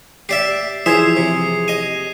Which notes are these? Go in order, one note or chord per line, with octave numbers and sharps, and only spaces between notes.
G4 D5 E5 C7
E3 F3 G#4 C5 E5 D#6 G#6 C7
C3
D#5 G#5